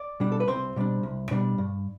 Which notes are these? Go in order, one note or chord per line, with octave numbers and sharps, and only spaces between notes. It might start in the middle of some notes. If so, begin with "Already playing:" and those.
Already playing: D5
B2 G3 D4
A4
B4
C2 C4 C5
B2 G3 D4
C2
B2 G3 D4
G2